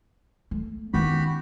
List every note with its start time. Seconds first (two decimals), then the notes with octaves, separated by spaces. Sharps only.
0.51 A3
0.94 D#3 B3 C#4 E4 F#4 G4 B5